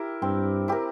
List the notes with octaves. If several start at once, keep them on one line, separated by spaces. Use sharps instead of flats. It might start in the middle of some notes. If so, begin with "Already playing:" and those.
Already playing: E4 G4 A#4
G2 C4
E4 G4 A#4